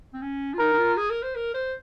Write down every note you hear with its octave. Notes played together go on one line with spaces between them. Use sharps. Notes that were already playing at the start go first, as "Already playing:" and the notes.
C4
C#4
F4
D#4 A#4
D#4
F4
G#4
A#4
C5
A#4
C5